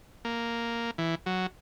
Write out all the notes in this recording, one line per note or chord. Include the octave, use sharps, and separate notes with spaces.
A#3
E3
F#3